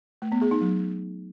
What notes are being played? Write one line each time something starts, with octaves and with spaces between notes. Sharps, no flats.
A3
B3
G#4
D#4
F#3